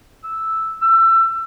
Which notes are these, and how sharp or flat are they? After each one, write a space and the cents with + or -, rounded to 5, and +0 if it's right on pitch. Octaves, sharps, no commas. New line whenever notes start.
E6 -5
E6 +25